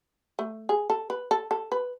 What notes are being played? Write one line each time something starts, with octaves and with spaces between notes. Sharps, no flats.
A3
G#4
A4
B4
A4
A4
B4